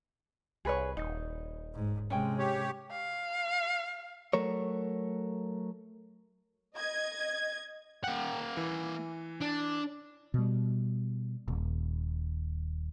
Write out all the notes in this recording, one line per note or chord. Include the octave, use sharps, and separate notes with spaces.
C2 G#4 B4 C#5
D#1 D#4
G#2
C3 G#3 C#4 G5
G4 C#5
F5
F#3 A3 A#4 C#5
D#5 G#6
A#3 F#5 G5
E3
D4
B2 G3
D#1